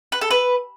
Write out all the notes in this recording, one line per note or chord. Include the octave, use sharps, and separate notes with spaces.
B4
A4
B4